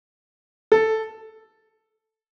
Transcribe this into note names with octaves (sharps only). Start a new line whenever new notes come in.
A4